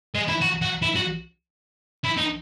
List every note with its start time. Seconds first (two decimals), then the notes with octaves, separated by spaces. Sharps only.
0.15 G#3
0.28 E4
0.41 F#4
0.62 F#4
0.82 E4
0.96 F#4
2.04 E4
2.17 D#4